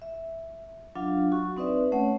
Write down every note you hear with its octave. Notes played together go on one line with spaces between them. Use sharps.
E5
F#3 D4 F4 F5
F#3 F#4 C#6
C4 D#4 B4 D5 E5
A3 C#4 C#5 F#5